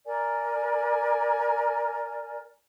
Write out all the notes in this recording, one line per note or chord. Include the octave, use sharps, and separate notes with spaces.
A#4 D5 G#5